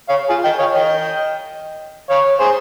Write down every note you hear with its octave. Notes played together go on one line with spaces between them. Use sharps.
C#5 F5
F4 G#4
D#5 G5
C#5 F5
D#5 G5
C#5 F5
G#4 C5